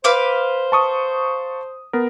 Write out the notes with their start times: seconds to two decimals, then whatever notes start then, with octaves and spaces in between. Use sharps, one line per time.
0.04 B4 C5 F5 D6
0.72 A5 C#6 D#6
1.93 B3 A#4